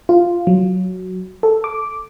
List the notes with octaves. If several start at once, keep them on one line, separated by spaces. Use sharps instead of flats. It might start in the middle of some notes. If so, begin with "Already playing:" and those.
F4
F#3
A4
D6